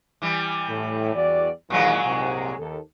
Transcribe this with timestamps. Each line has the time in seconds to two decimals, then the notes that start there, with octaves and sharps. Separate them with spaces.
0.22 E3 G3
0.69 A2
1.15 E2 F#4 D5
1.70 D#2 A#2 E3 F#3 G#3
2.05 C2 G#2 C3
2.59 D#2 A4